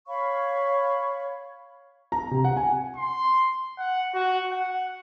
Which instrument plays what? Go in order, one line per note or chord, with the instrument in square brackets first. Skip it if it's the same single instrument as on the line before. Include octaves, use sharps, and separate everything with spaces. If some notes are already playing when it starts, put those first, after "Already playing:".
[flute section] C#5 F5 B5 C#6
[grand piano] A#5
C3
F#5
G#5
[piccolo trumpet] C6
F#5
F#4
F#5